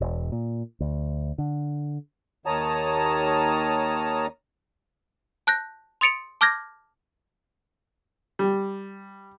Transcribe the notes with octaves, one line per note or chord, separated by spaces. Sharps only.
E1
A#2
D2
D3
D#2 D#3 C#5 A5 A#5 D#6
A5 F#6 G6 A#6
C6 D#6 A6 C#7 D7 F7
A5 D6 F6 G6 G#6 A#6
G3